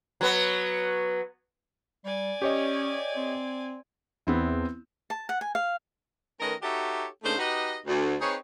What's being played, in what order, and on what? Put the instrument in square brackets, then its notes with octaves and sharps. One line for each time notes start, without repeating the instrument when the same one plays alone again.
[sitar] F#3 B3
[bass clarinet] G3 [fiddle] D5 G#5
[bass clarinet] C#4 [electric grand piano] G4 C#5 D#5
[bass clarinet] C4
[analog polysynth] E2 [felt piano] B3 C4 E4
[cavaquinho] A5
F#5
G#5
F5
[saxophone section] D#3 A3 C#4 A#4 B4 D#5
D#4 F#4 G4 A4 C#5 E5
C#3 A3 A#3 D4 D#4 C5
D#4 F#4 G4 B4 D#5
D2
C4 D#4 G#4 B4 C#5